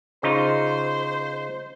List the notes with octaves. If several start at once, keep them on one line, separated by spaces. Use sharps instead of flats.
C#3 D#4 F4 C5